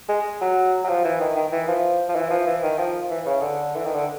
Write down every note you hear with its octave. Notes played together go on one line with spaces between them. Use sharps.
G#3
F#3
F#3
F3
E3
D#3
D#3
E3
F3
F3
E3
F3
E3
D#3
F3
E3
C#3
D3
E3
D#3
D3